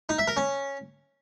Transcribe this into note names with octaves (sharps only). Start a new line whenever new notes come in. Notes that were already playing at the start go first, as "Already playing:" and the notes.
D#4
E5
A#4
C#4